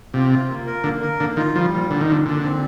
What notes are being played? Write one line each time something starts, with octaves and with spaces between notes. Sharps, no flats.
C3 F4
F4
A#3
A#4
D3 A#3
A#4
D3 A#3
D#3 F4
F3 G3
A#2
A#2 D3
D#3
A#2 D3
A#2 D3
C4